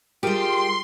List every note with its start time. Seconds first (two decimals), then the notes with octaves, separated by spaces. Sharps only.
0.23 G3 F4 G4 G#4 A#4 G5 C6